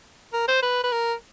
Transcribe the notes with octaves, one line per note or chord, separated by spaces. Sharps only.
A#4
C5
B4
B4
A#4